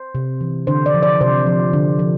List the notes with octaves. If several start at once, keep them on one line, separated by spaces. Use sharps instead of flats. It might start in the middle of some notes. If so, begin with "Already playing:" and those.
Already playing: C5
C3
E3
D3 C5
D5
F3
D5
C3 C5
F3
D3
F3